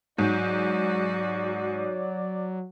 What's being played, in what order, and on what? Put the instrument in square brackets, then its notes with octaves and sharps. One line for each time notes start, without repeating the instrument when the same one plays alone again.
[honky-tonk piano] G#2 [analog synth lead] F#3 [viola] F#4 [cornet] D5